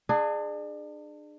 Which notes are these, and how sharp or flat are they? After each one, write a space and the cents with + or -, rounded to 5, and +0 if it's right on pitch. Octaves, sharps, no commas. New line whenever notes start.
D4 +35 G#4 +0